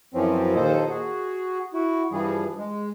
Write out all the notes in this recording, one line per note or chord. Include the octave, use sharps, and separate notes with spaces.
F#2 E3 F3 C4 C#4
D#2 A#2 A#3 A4 C5 D#5
F#4 G#4
E4 F#4
G2 E3 F3 G3 G#4
G#3